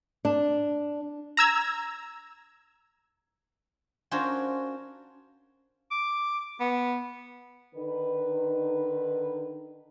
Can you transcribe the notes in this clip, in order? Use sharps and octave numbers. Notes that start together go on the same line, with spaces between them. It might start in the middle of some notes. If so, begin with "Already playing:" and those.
D4
A#5 E6 G#6
C#4 D4 F4 F#4 A#4 C5
D6
B3
D3 D#3 D#4 B4